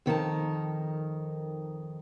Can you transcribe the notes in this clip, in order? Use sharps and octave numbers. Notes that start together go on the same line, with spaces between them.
F2 D#3 A#4 A5